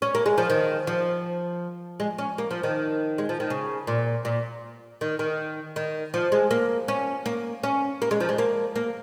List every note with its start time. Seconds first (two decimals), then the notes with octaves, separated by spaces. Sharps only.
0.02 C#4
0.15 A#3
0.26 G#3
0.38 F3
0.50 D#3
0.87 F3
2.00 G#3
2.18 C#4
2.38 A#3
2.51 F3
2.63 D#3
3.18 G#3
3.29 F3
3.40 D#3
3.50 C#3
3.87 A#2
4.25 A#2
5.01 D#3
5.19 D#3
5.76 D#3
6.14 F3
6.32 G#3
6.51 A#3
6.88 C#4
7.26 A#3
7.63 C#4
8.02 A#3
8.11 G#3
8.20 F3
8.29 G#3
8.38 A#3
8.76 A#3